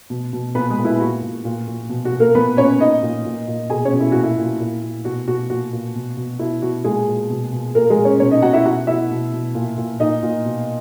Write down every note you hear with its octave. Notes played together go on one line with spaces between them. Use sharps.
B2
B2
A#2 B3 B4
G#3 G#4
A#2
E4
A#2 F#4
A#2
A#2
A#2
B2
F#4
B2
A#3 A#4
A#2 B3 B4
A#2 C#4 C#5
A#2 D#4 D#5
A#2
A#2
A#2
B2 G#4 G#5
C#4 C#5
B2
E4
A#2 F#4
E4
A#2
A#2
A#2
B2 F#4
B2 F#4
A#2 F#4
A#2
B2
B2
B2 E4
B2 F#4
A#2 G#3 G#4
A#2
B2
B2
A#2 A#3 A#4
G#3 G#4
A#2
C#4 C#5
B2 C#4 C#5
D#4 D#5
B2 F#4 F#5
E4 E5
B2 F#4 F#5
B2 E4 E5
B2
B2
A#2
A#2
A#2 D#4 D#5
A#2
B2